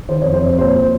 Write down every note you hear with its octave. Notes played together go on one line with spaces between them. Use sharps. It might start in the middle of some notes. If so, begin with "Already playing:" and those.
D#3 C5
C#5
F2
C5
F2 C#5
A#2 C5
A#2